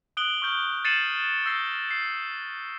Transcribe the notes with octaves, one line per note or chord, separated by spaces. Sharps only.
D#6 F#6 D7 F#7 G7
C#6 F6 G6 G7
A6 C7 C#7 D#7 E7 F#7
E6 G6 A#6 C7 G7
C7